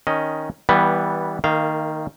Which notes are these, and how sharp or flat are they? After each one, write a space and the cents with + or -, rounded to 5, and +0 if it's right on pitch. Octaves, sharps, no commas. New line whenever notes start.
D#3 +0 C#4 +0 D#5 +0
E3 -25 G3 +0 B3 -10
D#3 +0 A#3 -30 F5 -15